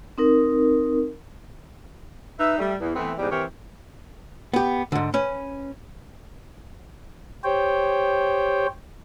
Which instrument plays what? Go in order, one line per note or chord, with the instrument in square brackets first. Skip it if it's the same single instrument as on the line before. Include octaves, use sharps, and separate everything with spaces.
[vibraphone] C4 D#4 A#4
[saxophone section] D#4 B4 E5
G3 A3
E2
E3 A3 B3 C4
E2 G#2 G3
E3 C4 G4 A#4 C#5
[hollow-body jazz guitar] B3 G4
G#2 D3
C#4 B4
[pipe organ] G4 C5 C#5 G5